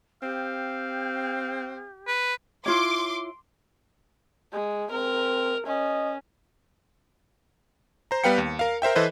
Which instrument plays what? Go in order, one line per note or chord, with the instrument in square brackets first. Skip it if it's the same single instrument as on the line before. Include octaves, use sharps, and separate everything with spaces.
[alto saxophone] C4 [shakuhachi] G4 [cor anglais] F5
[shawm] B4
[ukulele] E4 F4 C#5 [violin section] C6 D6
[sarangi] G#3
[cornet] C4 [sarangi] A#4
[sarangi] C#4 [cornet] D#5
[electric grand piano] C5 A#5
G3 B3 B4 F5 G5 C#7
D#2
A#4 F5
A#4 C5 E5 G5
E3 A4 B4 C5 D#5 E5